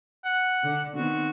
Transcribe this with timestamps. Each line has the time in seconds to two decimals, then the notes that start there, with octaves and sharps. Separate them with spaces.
0.25 F#5
0.63 D3 D4
0.96 D#3 B3 C4 F#4